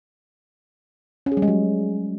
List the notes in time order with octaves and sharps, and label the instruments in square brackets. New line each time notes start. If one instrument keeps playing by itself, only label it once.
[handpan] C#4
G#4
G3
G#3
F#3